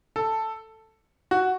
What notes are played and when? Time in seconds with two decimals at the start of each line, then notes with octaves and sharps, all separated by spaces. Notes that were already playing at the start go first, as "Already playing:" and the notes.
0.16 A4
1.31 F#4